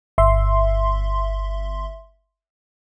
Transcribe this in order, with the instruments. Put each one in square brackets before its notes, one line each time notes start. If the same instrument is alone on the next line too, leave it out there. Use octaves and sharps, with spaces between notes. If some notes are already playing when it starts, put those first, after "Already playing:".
[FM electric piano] G1 E5 C6